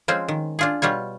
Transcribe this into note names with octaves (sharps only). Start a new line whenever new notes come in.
F3 G#3 C4 C#4
D#3
D4 F4 G#4
B2 G3 F4 C#5